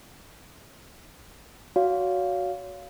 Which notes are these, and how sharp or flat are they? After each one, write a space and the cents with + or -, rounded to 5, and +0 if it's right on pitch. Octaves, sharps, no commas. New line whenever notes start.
F#4 +0 C#5 +35 F5 +0